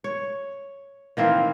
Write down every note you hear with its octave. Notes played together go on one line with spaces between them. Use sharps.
C#5
D#3 E3 A#3 C4